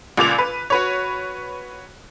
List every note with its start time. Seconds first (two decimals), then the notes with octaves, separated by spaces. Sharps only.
0.17 C#2 A#2 D6 F7
0.38 B4
0.70 F#4 B4 C#5